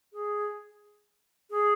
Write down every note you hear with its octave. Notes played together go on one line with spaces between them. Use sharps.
G#4
G#4